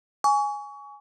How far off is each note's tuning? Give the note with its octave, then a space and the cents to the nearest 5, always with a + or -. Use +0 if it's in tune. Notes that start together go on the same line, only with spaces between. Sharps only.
G#5 +0 C#6 +30